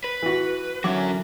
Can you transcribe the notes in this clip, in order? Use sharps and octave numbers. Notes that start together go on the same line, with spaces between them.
B4
E3 F#4
D3 E3 F#3 C#4 F#4 D6